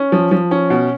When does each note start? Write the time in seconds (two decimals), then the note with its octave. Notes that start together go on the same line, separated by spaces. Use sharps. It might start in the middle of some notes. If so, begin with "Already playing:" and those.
Already playing: C#4
0.12 F3
0.31 F3
0.51 C#4
0.70 B2